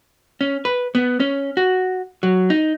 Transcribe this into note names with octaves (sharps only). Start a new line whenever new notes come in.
C#4
B4
B3
C#4
F#4
F#3
D#4